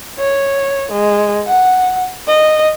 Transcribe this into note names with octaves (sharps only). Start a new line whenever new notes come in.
C#5
G#3
F#5
D#5